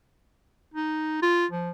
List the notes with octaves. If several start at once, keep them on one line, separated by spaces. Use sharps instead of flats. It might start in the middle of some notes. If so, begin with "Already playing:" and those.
D#4
F4
F3